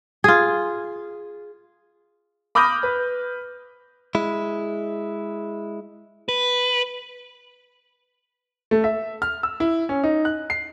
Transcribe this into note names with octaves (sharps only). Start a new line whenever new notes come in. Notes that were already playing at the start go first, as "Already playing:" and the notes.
F4 G#4
B5 D6 D#6 F6 G6 A#6
B4
G#3 E4
B4
A3
E5
F6
E6
E4
C#4
D#4
F#6
C7